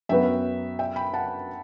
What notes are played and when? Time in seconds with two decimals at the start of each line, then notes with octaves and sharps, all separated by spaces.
0.09 F#2 F#3 B3 F#4 B4 E5 G5
0.79 E5 G5
0.96 G5 B5
1.14 F#5 A5